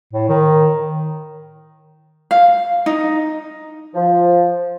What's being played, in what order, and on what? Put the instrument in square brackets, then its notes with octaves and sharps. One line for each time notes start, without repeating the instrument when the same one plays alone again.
[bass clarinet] A2
D#3
[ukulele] F5
D#4
[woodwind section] F3